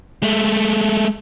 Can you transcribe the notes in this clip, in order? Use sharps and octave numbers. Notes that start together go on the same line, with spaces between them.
G#3 A3